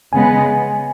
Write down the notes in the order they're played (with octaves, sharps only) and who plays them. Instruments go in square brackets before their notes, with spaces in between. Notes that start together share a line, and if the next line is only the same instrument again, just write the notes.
[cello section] C#3 G#3 B3 [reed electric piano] G#5